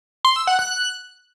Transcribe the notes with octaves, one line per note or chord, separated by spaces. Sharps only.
C6
E6
F#5
F#6